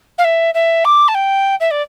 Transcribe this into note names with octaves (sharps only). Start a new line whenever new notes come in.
F5
E5
E5
D6
A5
G5
E5
D5